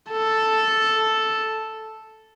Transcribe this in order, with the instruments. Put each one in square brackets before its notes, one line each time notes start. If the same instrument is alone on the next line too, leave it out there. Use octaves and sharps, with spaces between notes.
[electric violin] A4